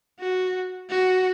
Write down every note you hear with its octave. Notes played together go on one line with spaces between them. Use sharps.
F#4
F#4